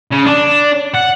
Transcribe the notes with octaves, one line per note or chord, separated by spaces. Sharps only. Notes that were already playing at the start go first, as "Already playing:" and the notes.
C#3
D4
F#5